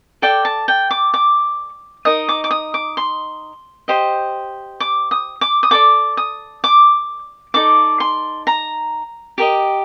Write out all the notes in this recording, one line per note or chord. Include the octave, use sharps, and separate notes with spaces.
A4 D5 G5
A5
G5
D6
D6
D#4 A#4 D#5 D#6
D6
D6
D#6
D6
C6
G4 C5 D#5
D6
D#6
D6
D#6
A4 D5 D6
D#6
D6
D#4 A4 D5 D6
C6
A#5
G4 A#4 D#5